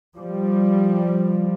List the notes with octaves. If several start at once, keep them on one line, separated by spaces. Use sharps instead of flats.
F3 G3